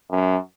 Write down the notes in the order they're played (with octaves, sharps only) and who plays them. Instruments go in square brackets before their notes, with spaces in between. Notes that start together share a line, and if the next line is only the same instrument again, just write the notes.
[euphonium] F#2